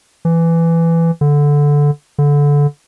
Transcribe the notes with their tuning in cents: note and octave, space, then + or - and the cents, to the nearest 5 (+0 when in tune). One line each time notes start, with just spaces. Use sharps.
E3 +15
D3 -10
D3 -20